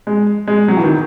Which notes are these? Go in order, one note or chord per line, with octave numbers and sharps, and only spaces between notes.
G#3
G#3
F#3
E3
D#3